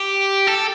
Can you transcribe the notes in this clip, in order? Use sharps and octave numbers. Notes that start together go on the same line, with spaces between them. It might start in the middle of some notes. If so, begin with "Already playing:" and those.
Already playing: G4
A4